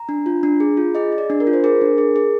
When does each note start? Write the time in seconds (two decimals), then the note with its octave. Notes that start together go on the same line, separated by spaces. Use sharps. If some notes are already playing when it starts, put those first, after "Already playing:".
Already playing: A#5
0.09 D4
0.26 F4
0.43 D4
0.60 G#4
0.77 F4
0.95 G#4 D#5
1.12 G#4
1.18 D5
1.30 D4
1.40 A#4
1.47 F4
1.53 C5
1.64 G#4 A#4
1.81 D4
1.98 G#4
2.16 G#4